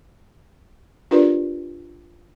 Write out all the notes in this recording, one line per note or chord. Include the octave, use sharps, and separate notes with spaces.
D4 F4 G4 A#4 B4 D5